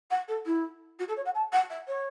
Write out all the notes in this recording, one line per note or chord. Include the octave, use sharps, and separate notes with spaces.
F#5
A4
E4
F#4
A4
C#5
F#5
A5
F#5
E5
C#5